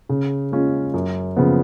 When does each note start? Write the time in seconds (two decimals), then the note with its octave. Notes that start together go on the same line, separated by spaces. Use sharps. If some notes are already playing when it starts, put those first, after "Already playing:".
0.09 C#3
0.52 G#3 C#4 F4
0.94 F#2
1.36 C#3 F3 B3